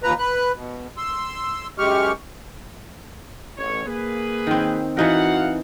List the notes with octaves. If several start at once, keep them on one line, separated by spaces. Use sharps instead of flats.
D#2 F3 B4 A#5
B4 F#6
B2
C6 E6
F#2 G#3 G4 C#6 F6
A1 C#5
A#3 G#4 B4
D#3 C4
E3 D#4 F#4 A#4 F5 F#5